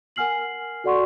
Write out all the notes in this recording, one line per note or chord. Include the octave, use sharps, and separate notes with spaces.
A#4 F#5 G#5 F6 C7 F#7
F#4 A4 D5 F#5 C6 C#6